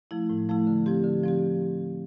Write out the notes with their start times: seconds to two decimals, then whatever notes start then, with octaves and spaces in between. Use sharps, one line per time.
0.11 F3 A3 E4
0.29 A2
0.49 F3 A3 E4
0.67 D3
0.86 F3 C4 G4
1.04 D3
1.24 F3 C4 G4